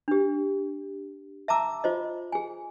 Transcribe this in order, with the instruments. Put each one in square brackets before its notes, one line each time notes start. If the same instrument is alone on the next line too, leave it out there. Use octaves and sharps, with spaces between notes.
[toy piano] D4 G4
E5 A5 A#5 D6 E6
F4 C5 D#5
G#4 G#5